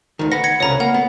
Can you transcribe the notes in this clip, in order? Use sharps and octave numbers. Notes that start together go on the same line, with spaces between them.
D2 D#3
B4 F#5 A#6
G#6 A#6 C#7
C2 C#3 B4 C#5 A#5
A#3 F#5
B3